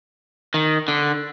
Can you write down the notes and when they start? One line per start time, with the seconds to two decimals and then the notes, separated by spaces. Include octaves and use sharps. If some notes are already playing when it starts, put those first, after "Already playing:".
0.54 D#3
0.88 D3